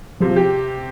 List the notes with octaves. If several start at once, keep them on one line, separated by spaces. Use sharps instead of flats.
C3 F3
F3
G4